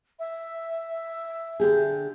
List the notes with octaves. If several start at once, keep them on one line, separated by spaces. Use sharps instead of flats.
E5
D3 G4 G#4